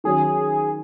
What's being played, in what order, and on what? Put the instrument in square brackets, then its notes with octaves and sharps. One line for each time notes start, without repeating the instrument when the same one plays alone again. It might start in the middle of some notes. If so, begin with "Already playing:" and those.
[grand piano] D#3 F#3 C#4 [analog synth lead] G#4